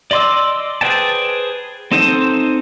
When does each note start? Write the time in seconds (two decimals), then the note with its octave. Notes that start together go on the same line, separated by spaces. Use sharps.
0.11 D5 D#5 C6 D6 E6
0.81 G#4 B4 C5 G5 A5
1.92 C4 D#4 A4 C5